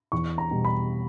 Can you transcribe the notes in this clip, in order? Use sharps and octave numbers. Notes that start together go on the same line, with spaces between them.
E2 C#6
A#5
B2 G3
B5